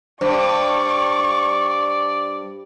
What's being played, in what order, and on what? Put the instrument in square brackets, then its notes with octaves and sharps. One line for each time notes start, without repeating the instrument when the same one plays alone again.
[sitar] G2 [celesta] C5 [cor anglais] D5 [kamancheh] C#6